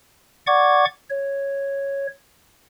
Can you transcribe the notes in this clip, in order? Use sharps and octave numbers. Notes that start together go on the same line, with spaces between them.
D5 F#5 C#6 D6 G#6
C#5